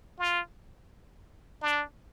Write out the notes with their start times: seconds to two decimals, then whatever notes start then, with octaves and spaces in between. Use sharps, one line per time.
0.19 F4
1.62 D4